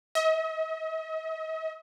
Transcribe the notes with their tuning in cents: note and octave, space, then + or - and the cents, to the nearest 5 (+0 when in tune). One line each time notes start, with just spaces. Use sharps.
D#5 +45